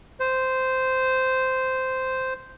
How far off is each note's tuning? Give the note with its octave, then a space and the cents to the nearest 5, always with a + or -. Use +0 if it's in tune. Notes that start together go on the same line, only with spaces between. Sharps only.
C5 -10